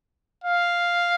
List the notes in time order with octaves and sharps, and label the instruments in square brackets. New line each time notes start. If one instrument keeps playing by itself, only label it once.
[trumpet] F5